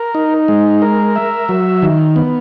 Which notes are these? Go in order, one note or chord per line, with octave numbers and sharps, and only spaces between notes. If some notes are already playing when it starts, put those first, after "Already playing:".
Already playing: A#4
D#4
G#3
A#4
E5
F#3
D#3
B3